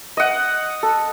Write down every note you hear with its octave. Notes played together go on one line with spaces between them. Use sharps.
D#5 F#5
A4